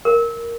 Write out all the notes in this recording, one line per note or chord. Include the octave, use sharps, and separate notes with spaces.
A#4